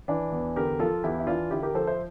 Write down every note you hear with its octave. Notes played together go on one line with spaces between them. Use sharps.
E3 D4
E2
D3 G4 A#4
F3 F4 A4
E2 E4 G4
E4
E3 D4 F4
D3 E4 G4
G4 A#4
F3 A4 C5
C5 E5